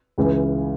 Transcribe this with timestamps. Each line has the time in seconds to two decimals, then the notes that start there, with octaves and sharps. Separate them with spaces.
0.18 C#2 C#3 E3